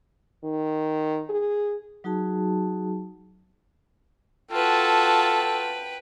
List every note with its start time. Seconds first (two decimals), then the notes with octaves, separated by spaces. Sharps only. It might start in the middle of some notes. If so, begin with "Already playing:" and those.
0.44 D#3
1.29 G#4
2.04 F#3 D#4 F#4 G#4 A5
4.52 F4 F#4 A4 B4 G5 A5